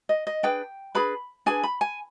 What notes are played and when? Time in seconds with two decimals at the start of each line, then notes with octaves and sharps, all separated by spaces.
0.09 D#5
0.27 D#5
0.43 D4 G#4 B4 G5
0.95 D4 G#4 B4 B5
1.46 D4 G#4 B4 G#5
1.63 B5
1.81 G#5